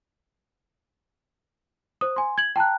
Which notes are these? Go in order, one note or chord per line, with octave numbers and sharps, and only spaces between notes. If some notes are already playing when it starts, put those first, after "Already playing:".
C5 D#6
G#5 C6
G#6 F#7
G5 A5 A#5 F#6